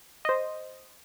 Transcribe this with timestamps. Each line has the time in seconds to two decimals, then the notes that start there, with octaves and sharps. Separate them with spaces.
0.25 C5 D#5